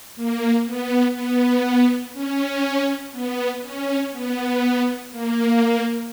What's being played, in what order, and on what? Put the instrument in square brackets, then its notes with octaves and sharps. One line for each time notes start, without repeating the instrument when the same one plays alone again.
[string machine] A#3
B3
B3
C#4
B3
C#4
B3
A#3